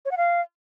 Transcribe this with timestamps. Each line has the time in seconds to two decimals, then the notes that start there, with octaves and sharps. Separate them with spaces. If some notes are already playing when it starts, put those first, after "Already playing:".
0.05 C#5
0.11 F#5
0.17 F5